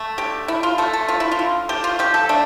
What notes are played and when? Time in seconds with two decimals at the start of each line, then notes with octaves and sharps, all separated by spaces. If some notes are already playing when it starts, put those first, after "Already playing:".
Already playing: A3
0.18 D3 G4
0.48 D3 E4
0.63 F4
0.78 A3 A4
0.93 A4
1.08 D3 F4
1.20 E4
1.32 F4
1.39 D3
1.69 A3 G4
1.84 F4
1.99 F3 G4
2.14 A4
2.29 A3 D4